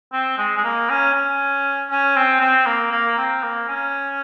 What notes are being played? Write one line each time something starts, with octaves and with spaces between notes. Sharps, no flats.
C4
G#3
G#3
A#3
C#4
C#4
C#4
C4
C4
A#3
A#3
C4
A#3
C#4